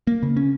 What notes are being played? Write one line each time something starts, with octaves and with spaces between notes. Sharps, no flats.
A#3
C#3
C#4